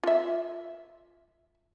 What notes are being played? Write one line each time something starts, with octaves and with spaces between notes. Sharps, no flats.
F4 E5